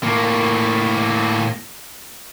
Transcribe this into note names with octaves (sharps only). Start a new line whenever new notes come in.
A2 A#3